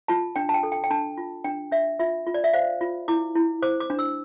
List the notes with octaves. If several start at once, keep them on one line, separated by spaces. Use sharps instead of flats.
F4 A5
D4 G5
A5
G5
A4
G5
G5
D4 A5
F4
D4 G5
D4 E5
F4 E5
F4
D5
E5
C5 F5
F4
E4 D6
E4
C5 D6
D6
D4
E6